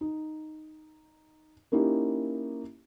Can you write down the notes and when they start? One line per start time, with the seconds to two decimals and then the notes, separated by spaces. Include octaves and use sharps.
0.01 D#4
1.72 A#3 C#4 D#4 E4 G4